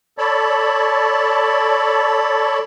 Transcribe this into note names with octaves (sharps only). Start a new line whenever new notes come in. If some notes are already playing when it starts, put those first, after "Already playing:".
A4 C#5 D5 A5 B5